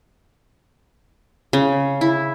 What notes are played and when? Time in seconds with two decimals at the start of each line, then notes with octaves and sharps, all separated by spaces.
1.53 C#3
2.01 E4